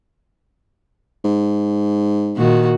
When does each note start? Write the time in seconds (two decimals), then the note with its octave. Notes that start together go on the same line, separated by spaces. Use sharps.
1.24 G#2
2.36 A#2 D#3 F#4